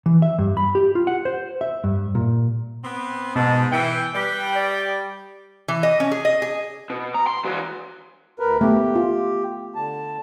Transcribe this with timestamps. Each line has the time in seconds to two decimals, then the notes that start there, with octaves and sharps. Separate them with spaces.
0.06 E3
0.22 E5
0.38 G2
0.57 B5
0.75 G4
0.95 F4
1.07 F#5
1.25 C5
1.61 E5
1.84 G2
2.15 A#2
2.83 B3 C4
3.36 G#2 B2 A5
3.72 E3 E5 G5
4.15 G3 B4
4.55 D5
5.68 E3
5.83 D#5
6.00 C#4
6.12 G#4
6.25 D#5
6.42 G#4
6.90 B2
7.14 A#5
7.27 C6
7.45 E3 F#4
8.39 D2 A#4 B4
8.61 A3 B3 G4
8.95 F4
9.75 D3 A5